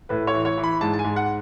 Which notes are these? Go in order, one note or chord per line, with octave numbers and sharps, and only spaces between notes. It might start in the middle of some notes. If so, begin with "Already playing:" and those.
A2 B4
C#5
E3
C#5
E3
B5
G#2 A5
A5
G#5
G#2
F#5